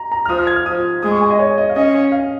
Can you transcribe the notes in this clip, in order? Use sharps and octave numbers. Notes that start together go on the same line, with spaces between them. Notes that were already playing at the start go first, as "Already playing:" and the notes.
Already playing: A#5
A#5
F6
F3 D#6
F6
G#6
F6
F3 D#6
G#3 D#6
C#6
G#5
D#5
C#5
D#5
F5
C#4 D#5
F5